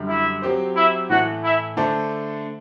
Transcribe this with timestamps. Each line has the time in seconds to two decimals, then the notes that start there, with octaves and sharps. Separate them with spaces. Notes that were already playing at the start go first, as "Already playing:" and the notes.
Already playing: F#2 D3 G3
0.08 E4 E5
0.42 F#3 C4 G4 C5
0.76 E4 E5
1.09 A2 E3 A3 F#4 F#5
1.44 E4 E5
1.77 D3 A3 D4 A4 C5